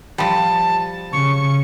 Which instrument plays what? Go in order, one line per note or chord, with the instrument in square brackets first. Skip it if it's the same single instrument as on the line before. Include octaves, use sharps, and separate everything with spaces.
[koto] F3 G3 [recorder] A5
[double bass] C#3 [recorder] C#6